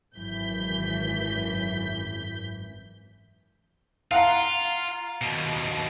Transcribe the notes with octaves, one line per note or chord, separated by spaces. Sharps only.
G#1 F#2 E3 G6 B6
F4 F5 F#5 A#5
D#2 B2